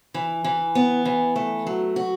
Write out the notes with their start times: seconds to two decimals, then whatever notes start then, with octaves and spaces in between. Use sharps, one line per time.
0.14 E3
0.44 E3
0.75 B3
1.05 E3
1.36 A3
1.67 F#3
1.96 F#4